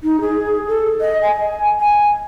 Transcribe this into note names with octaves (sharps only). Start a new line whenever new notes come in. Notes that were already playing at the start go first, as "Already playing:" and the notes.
D#4
G#4
A4
D#5
G#5
G#5